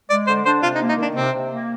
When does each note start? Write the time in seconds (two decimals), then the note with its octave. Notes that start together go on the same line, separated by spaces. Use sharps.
0.10 G#3 D5
0.27 D3 C5
0.45 D4 C5
0.63 C3 F4
0.75 D#4
0.80 A#3
0.89 D#4
0.98 D#3 D4
1.15 C3 C4
1.33 C3
1.50 A#3